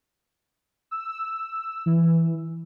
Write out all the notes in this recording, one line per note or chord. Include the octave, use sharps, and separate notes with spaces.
E6
E3